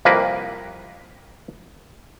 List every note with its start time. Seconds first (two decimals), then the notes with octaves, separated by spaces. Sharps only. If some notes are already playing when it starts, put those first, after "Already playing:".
0.05 C2 F2 A#3 B4